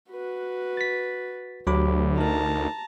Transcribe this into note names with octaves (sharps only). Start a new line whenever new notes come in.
F#4 B4
A6 B6
D2 F#3 G4 B5 D6
D#4 A#4 A5 A#5